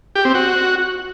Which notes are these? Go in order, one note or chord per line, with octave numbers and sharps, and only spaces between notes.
G4
C4
F#4